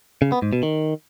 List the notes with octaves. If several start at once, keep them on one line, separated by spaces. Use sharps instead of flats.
C#3
B3
G#2
B2
D#3